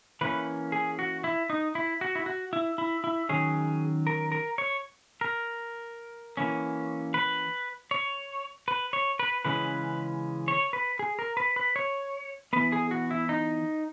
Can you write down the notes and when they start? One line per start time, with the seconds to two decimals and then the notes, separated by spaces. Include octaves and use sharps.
0.21 E3 A#3 C#4 B4
0.72 G#4
0.99 F#4
1.24 E4
1.50 D#4
1.75 E4
2.01 F#4
2.15 E4
2.26 F#4
2.53 E4
2.78 E4
3.04 E4
3.29 D#3 F#3 C#4 G#4
4.07 A#4
4.32 A#4
4.58 C#5
5.21 A#4
6.37 E3 A#3 C#4
7.14 B4
7.91 C#5
8.68 B4
8.93 C#5
9.19 B4
9.45 C#3 E3 G#3 C#4 B4
10.48 C#5
10.73 B4
10.99 G#4
11.19 A#4
11.37 B4
11.56 B4
11.76 C#5
12.53 E3 B3 B4
12.72 G#4
12.91 F#4
13.11 E4
13.29 D#4